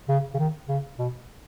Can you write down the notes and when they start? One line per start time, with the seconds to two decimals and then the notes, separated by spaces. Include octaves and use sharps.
0.09 C#3
0.34 C#3
0.39 D#3
0.68 C#3
0.99 B2